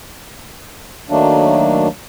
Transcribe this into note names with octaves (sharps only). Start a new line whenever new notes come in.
D#3 F#3 A3 A#3 D4